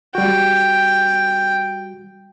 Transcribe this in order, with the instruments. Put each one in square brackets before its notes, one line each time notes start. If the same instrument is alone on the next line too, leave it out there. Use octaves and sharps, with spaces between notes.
[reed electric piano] G3 F#4 [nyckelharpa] G5